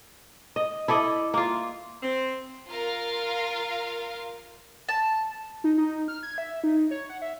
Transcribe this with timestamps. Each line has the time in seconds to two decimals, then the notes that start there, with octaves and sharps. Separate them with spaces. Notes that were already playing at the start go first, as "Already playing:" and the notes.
0.56 D#5
0.88 E4 A4 D5 D#5
1.34 A#3 F4
2.03 C4
2.68 F4 A#4 F5
4.89 A5
5.64 D#4
5.78 D#4
6.08 F6
6.23 G#6
6.38 E5
6.64 D#4
6.91 C#5
7.09 F#5
7.22 E5